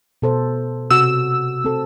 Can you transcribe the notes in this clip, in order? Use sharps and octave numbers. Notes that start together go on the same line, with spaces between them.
B2 A4 C5
C3 F#4 E6
C4 A4